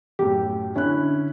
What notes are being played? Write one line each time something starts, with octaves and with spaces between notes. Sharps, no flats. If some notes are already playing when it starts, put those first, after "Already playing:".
F#2 A2 G4
D3 C#4 E4 F#6